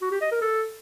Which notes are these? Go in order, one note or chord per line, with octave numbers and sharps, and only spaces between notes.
F#4
G4
D#5
A#4
A4